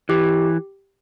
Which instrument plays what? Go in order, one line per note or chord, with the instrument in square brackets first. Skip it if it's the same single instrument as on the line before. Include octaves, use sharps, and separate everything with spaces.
[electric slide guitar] E3 [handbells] G4